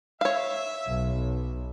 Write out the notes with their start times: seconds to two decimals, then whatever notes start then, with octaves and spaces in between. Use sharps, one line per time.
0.21 C#5 E5 F5
0.88 B1